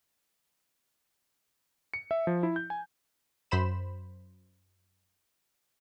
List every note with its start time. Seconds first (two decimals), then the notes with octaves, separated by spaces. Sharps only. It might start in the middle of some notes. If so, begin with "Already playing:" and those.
1.94 C#7
2.11 E5
2.27 F3
2.43 E4
2.56 G6
2.70 G#5
3.51 F#2 C5 B5 E7